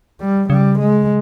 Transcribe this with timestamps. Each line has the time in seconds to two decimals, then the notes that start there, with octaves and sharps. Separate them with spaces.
0.21 G3
0.49 C#3 G3
0.79 G#3